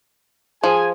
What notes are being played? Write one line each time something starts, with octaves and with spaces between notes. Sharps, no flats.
F3 G#4 G#5